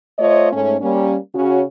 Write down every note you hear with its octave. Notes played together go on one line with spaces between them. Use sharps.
A3 F4 C5 C#5 D#5
G#2 A3 C#4
G3 A#3 C#4
C#3 C#4 F#4